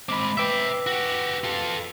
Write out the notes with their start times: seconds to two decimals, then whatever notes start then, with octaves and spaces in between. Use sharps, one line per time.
0.09 G#3 C4 B5 D6
0.37 B4 E5 G5 D6 E6
0.87 F#4 G4
1.44 F4 A4